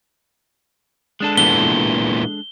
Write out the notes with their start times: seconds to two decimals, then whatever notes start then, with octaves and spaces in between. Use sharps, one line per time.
1.20 G#3 D4 A4
1.37 A#2 E3 B3 G7